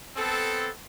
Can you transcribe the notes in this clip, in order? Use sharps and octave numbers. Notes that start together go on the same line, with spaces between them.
B3 C4 A4